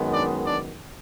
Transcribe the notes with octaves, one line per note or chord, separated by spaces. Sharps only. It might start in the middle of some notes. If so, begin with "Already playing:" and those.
Already playing: F#2 D#3 G#3 B3
D4 D5
D4 D5